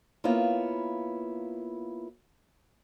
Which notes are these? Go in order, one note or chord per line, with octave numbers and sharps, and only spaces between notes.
A#3 B3 E4 F4 C#5